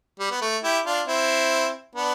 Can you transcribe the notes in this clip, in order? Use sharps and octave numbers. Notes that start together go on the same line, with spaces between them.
G3
B3
A3
E4 G4
D4 F4
C4 E4
B3 D4